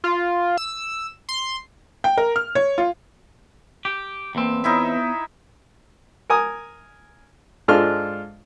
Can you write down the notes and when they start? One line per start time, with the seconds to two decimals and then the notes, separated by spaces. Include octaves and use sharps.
0.04 F4
0.57 E6
1.29 C6
2.04 G5
2.18 A#4
2.36 F6
2.55 C#5
2.78 F4
3.85 G4
4.35 E2 A#3 C4
4.64 B3 D#4 E4 E5
6.30 A#4 G#5 D#6
7.68 G#2 G#3 D4 F4 A4 F6